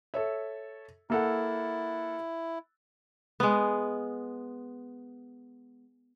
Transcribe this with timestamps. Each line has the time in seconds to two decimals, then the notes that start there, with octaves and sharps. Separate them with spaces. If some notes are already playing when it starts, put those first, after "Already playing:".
0.14 A4 C#5 E5
1.10 A#3 E4 A4 F#5
3.40 G#3 B3